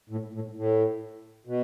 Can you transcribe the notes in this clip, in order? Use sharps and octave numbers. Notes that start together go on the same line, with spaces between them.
A2
A2
A2
B2